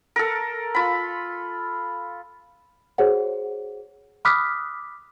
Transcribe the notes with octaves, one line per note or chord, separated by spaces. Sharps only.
A4 A#4
F4 B5
F#4 G#4 C5 C#5 F#5
B5 D6 D#6 F6 F#6 B6